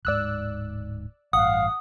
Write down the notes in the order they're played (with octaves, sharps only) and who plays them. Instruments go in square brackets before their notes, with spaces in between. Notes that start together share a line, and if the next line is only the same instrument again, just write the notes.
[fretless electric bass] D1 G#2 [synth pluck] D5 E6 F#6
[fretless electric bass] A1 G2 [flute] F5 [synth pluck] F#5 [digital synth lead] D#6